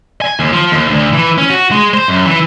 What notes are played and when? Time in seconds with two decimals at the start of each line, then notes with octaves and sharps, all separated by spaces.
0.22 G#5
0.40 D#2
0.53 F3
0.72 D#2
0.88 D2
1.13 E3
1.38 C#4
1.50 F#4
1.71 G#3
1.94 C5
2.08 F#2
2.25 E3